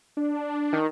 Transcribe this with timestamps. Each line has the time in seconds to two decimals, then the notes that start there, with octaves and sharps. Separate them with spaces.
0.17 D4
0.73 D#3